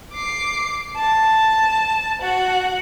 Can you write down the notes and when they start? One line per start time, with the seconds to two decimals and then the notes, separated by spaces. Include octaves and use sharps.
0.13 D6 C7
0.96 A5
2.22 F#4 F#5